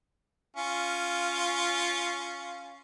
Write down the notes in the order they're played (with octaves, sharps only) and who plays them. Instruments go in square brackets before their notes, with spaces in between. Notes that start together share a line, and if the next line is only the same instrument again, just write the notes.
[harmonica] C#4 F4